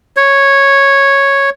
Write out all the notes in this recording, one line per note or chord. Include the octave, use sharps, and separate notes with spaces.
C#5